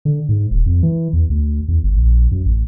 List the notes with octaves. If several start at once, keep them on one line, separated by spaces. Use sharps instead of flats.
D3
G#2
D#1
F2
E3
E2
D2
E2
G1
A#1
F#2
A1